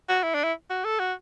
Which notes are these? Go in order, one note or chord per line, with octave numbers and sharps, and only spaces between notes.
F#4
E4
D4
E4
F#4
A4
F#4